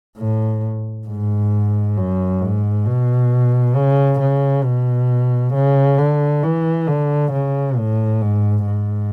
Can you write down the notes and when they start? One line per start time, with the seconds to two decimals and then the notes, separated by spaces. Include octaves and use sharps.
0.18 A2
1.07 G#2
1.97 F#2
2.41 G#2
2.86 B2
3.75 C#3
4.20 C#3
4.64 B2
5.54 C#3
5.98 D3
6.43 E3
6.88 D3
7.32 C#3
7.77 A2
8.21 G#2
8.66 G#2